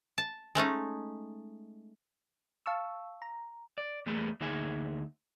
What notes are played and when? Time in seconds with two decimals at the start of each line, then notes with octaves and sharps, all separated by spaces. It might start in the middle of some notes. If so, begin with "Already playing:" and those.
0.18 A5
0.55 G#3 A3 C#4 D#4
2.66 F5 A5 C#6 E6
3.22 A#5
3.78 D5
4.06 E2 G3 A3 A#3 G#4 B4
4.41 D2 A#3 D#4 G#4 E5 G#5